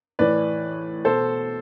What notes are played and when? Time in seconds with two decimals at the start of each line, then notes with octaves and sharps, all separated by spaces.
0.19 A2 E3 B4 D5
1.05 B2 A4 C5